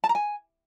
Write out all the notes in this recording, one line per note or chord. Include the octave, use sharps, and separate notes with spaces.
A5
A#5
G#5